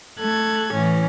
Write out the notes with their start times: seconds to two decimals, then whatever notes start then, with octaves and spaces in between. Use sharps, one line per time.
0.18 A3 A4 F#6 G#6
0.71 A2 E3 C#4